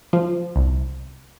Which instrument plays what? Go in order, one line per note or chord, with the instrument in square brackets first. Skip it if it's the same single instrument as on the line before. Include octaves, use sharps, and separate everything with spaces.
[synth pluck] F3
C2